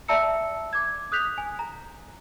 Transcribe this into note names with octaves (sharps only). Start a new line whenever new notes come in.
D5 E5 A5 A#5 E6 C#7
D6 G#6
D#6 F#6 G6 B6 F7
G#5
A#5